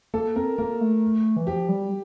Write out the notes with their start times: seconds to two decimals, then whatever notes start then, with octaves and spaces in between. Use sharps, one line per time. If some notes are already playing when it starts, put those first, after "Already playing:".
0.14 A#3 A4
0.36 C4 A#4
0.58 A#3 A#4
0.81 A3
1.36 E3
1.46 F3 G4
1.69 G3